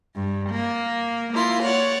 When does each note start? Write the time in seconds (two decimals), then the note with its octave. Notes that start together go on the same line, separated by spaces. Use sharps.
0.15 G2
0.50 A#3
1.32 A#3 E4 F4 C6
1.62 C#5 D5 F#5